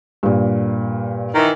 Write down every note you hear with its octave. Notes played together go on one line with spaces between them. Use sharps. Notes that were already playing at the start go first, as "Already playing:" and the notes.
G2 A#2
D#3 E3